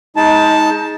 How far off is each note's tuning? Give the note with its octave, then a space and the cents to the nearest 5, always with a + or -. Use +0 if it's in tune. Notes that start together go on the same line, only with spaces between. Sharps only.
G#3 +0 D#4 +25 A5 +0